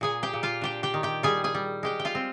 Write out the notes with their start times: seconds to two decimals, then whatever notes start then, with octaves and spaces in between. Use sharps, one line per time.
0.01 A#2 G#4 G#5
0.23 G4 G5
0.33 A#2
0.43 F4 F5
0.61 D4 G4 G5
0.83 G4 G5
0.94 D#3
1.03 G4 G5
1.23 G3 G#4 G#5
1.44 G#4 G#5
1.55 G3
1.83 G#3 G4 G5
2.00 G5
2.05 F4 F5
2.15 C4